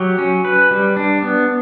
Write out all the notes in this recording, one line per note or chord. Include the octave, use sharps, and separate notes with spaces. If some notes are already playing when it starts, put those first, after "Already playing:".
Already playing: F#3 G4
C#4
B4
G3
D4
B3